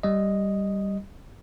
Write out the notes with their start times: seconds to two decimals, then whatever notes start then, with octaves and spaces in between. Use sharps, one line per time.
0.03 G3 D#5